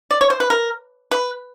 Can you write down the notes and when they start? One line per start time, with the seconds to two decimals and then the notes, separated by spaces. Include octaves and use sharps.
0.11 D5
0.21 C#5
0.30 C5
0.40 B4
0.50 A#4
1.11 B4